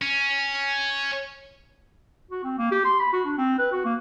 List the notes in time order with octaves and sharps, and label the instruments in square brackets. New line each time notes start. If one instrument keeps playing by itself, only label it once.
[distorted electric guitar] C#4
[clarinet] F#4
C4
A#3
G4
C6
B5
F#4
D4
C4
B4
F#4
A#3